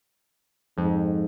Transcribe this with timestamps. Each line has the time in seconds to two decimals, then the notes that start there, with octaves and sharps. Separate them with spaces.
0.78 F2 G#2